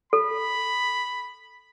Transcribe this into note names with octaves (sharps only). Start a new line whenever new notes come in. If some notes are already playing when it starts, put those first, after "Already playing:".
A4 B5